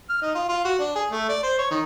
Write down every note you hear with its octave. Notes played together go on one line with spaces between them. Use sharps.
F6
D#4
F4
F4
F#4
D4
G#4
A3
D5
C5
C#5
D#3